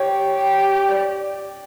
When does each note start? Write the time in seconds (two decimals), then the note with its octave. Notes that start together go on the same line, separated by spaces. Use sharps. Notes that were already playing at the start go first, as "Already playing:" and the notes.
Already playing: G4 C#5
0.35 G4
0.89 D5